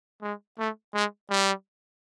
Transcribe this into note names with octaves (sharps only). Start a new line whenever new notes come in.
G#3
A3
G#3
G3